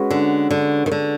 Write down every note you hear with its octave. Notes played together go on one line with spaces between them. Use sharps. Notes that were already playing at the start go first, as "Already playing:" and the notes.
Already playing: G#3 C#4 F#4 B4
D3
D3
D#3
D3